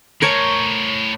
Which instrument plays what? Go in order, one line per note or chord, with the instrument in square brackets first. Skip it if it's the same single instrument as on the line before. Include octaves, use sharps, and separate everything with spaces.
[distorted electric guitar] A2 C5 [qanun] A#4 C#5 A5